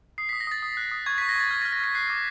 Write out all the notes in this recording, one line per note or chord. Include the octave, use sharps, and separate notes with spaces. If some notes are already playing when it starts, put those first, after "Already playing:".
D#6 C7
B6
D#6
A#6
D#6 A6
D#6
F#6
D#6
C#6 G#6
B6
C#6
A#6
C#6 A6
F6 G#6
A#6
F6
A#6
F6 B6
F#6 C7
D6